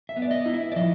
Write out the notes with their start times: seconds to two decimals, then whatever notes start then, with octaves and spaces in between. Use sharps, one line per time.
0.09 E5
0.16 B3
0.22 D5
0.31 D#5
0.46 E4
0.54 E5
0.72 D5
0.76 F3 D#5